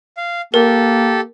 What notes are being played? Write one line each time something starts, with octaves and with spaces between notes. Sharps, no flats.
F5
A#3 G4 A4 A#4